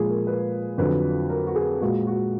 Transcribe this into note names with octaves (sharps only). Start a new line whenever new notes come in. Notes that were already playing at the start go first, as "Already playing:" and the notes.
Already playing: A#2 F3 G#3 G#4
A#4
B4
F2 D3 F#3 B4
A#4
F#4
G#4
A#2 G#3 F#4
F#4